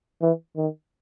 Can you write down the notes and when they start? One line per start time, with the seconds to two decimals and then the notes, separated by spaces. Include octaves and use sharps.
0.21 E3
0.56 D#3